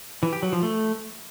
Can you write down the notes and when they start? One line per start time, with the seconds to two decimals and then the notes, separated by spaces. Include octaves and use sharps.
0.23 E3
0.33 G4
0.43 F#3
0.53 F3
0.63 A3